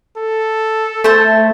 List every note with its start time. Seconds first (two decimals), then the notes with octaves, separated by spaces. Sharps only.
0.17 A4
1.04 A3 C5 A5